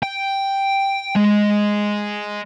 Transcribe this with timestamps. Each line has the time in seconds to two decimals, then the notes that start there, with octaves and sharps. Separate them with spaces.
0.03 G5
1.16 G#3